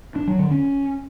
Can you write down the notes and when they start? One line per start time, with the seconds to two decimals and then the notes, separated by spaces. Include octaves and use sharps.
0.16 D4
0.27 F#3
0.39 D3
0.51 C#4